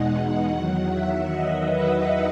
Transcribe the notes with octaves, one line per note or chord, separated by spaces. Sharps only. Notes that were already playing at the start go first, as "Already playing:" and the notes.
Already playing: E2 B2 G#3 D#4 F#5
E2 D#3 F#3 F#5
E5
D#5
B4